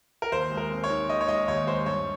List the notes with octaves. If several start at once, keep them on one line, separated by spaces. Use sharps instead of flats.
A#4
D#2 C5
G#3
A#4
C4
C#5
D#3
D#3 D#5
C#5
G#3 D#5
D#2 C#5
G#3 C5
G2 C#5